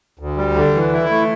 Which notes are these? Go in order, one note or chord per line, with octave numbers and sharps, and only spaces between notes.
D2
G3
D3
E3
E4
A3